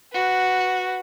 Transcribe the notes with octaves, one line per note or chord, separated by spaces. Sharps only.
F#4 B4